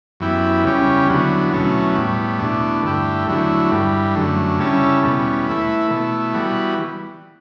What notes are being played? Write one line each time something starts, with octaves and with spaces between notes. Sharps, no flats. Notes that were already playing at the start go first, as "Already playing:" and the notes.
F#2 E3 B3 E4 G4
E2 C#3 G3 C#4 G4
E2 D3 F#3 B3
E2 B2 F#3 A3 C#4
A2 G3 B3
E2 B2 A3 D4
G2 D3 A3 E4 G4
E2 D3 F#3 A3 E4
G2 E3 G3
F#2 D3 A3
C#3 G3 C#4 E4 A4
E2 B2 G3 C#4
E3 A3 E4 B4
B2 A3 E4
E3 G3 B3 F#4